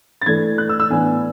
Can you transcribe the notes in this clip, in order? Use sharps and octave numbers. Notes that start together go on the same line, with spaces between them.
A6
E3 A3 D4 G#6
F#6
E6
E6
A2 E3 B3 D4 G#5